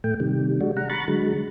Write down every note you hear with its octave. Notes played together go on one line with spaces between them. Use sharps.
A2 A3 G5
C3 D#3 G3
G#3 D4 F#4
F#5 A#5
A#5 B5 C#6 F#6 A6
D3 F#3 G#3